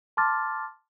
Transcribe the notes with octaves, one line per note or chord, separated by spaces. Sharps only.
A5 C6 D6 F6 A6